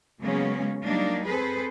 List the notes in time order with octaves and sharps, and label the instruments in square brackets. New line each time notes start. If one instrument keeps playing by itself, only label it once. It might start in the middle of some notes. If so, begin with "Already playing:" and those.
[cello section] C#3 F#3 G#3 A#3 B3 C#4
F#3 G3 A#3 D4 D#4
C4 G#4 A4 B4 C5